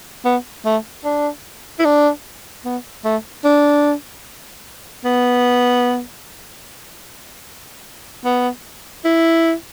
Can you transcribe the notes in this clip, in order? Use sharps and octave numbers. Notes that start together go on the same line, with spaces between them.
B3
A3
D4
E4
D4
B3
A3
D4
B3
B3
E4